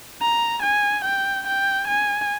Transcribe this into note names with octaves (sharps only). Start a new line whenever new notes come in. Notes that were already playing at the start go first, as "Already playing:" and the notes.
A#5
G#5
G5
G5
G#5